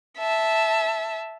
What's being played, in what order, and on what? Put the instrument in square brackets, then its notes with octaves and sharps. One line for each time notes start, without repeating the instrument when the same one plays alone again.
[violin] E5 A5